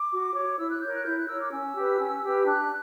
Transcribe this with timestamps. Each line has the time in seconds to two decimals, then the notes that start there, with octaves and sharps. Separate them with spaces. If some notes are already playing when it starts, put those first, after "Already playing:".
Already playing: D6
0.12 F#4
0.35 C#5
0.59 E4 E6
0.70 F#6
0.82 A#4 C#5 G6
0.94 F#6
1.05 E4 G6
1.18 F#6
1.28 A#4 C#5 E6
1.41 D6
1.52 C#4 E6
1.75 G4 B4
1.99 C#4
2.22 G4 B4
2.46 D4 F#6